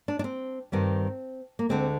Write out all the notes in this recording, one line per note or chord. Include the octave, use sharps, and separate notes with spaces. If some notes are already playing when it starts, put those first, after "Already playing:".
D4
D4
C4
G2 D#3 G3 C4
A#3
D2 D3 G#3 C4